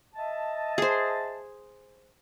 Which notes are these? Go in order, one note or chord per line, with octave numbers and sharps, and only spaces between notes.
D#5 E5 A5
G#4 C5